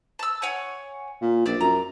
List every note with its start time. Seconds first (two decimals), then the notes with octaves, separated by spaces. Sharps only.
0.19 A5 E6
0.42 C#5 F#5 G#5
1.21 A#2
1.46 A#1 D5 E6
1.61 F#2 A#5